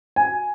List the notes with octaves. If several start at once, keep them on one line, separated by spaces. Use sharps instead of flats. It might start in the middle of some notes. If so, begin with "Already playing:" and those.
G#5